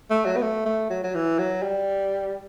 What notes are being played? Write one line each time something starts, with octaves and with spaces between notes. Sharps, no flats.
A3
F#3
B3
A3
A3
F#3
F#3
E3
F#3
G3